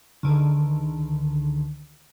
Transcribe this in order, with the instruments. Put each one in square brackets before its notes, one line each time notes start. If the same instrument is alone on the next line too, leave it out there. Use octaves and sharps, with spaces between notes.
[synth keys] C#2 D3 D#3